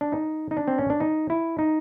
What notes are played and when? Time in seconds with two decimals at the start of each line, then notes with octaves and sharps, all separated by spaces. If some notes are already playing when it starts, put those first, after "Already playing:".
0.01 D4
0.12 D#4
0.51 D#4
0.57 D4
0.68 C4
0.79 C#4
0.90 D4
1.00 D#4
1.30 E4
1.59 D#4